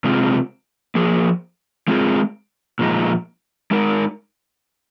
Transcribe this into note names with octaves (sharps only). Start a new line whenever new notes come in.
C3 G#3 C4 F4 G#4
F3 A#3 G#4
G#3 C4 F4 G#4
A#2 F3 G#3 D#4
G#3 D#4 A#4